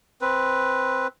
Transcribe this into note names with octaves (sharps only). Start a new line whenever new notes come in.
C4 B4